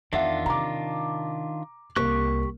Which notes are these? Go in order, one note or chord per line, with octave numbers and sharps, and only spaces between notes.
E2 D#3 D4 F4 E5 F#5
C3 A#5 D6
C2 A#3 G4 C#6 F#6